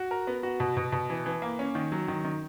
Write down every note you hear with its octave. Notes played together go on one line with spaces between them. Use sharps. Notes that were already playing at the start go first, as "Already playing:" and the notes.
Already playing: F#4
A#4
B3
F#4
B2
B2
B2
E3
E3
A#3
C#4
D#3
F#3
D#3
D#3